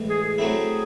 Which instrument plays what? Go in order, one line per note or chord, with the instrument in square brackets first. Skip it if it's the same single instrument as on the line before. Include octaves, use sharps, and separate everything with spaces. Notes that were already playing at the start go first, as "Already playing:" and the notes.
Already playing: [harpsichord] A2 E3 G#3
[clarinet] G#4
G#4
[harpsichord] F#3 A3 C4 E4